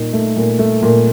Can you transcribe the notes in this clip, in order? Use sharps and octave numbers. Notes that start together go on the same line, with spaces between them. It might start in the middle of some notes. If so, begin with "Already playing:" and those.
Already playing: A#2 D#4
A3
A#2
A3
A#2